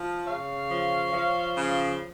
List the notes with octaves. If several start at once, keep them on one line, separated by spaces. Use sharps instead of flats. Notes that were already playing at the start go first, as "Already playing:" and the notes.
Already playing: F3
C#3 C#5 F5
F3
F3
C#3